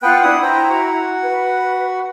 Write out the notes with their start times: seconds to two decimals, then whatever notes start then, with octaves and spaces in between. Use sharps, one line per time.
0.02 B3 F4 B4 F#5 G5 F#6
0.23 D4 E4 F#5 B5 D#6
0.43 E4 C5 G5 A#5
0.69 F#4 F#5
1.23 B4